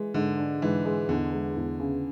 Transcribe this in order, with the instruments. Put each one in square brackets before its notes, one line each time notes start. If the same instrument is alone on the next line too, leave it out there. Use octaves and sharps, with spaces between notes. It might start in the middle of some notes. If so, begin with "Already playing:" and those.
Already playing: [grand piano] E3 [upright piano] G#3
[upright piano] G#2 [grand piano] D3
[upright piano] D4
[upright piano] G#2 [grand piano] E3
[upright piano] G#3
[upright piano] E2 [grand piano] D3
[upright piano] G#3
E2
C#3